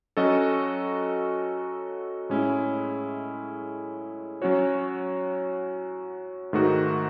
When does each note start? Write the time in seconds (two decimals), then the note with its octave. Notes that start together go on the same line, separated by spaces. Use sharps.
0.17 F#3 C#4 F#4 A4 D#5
2.29 A2 G#3 C#4 E4
4.42 F#3 C#4 F#4 C#5
6.53 G#2 D#3 A3 D#4 F#4